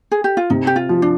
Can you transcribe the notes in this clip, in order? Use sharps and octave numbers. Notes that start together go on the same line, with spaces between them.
G#4
G4
F4
C3 D#4
G4
F4
F3
D4